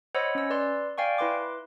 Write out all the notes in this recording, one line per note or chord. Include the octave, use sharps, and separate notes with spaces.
C5 C#5 D#5 F#5 B5 E6
C#4 E6
B4 D5 C6
D5 F5 G5 G#5 C#6
E4 B4 C6 D6